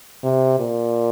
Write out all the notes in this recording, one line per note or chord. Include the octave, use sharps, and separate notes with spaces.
C3
A#2